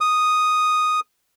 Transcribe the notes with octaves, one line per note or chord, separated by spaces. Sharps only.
D#6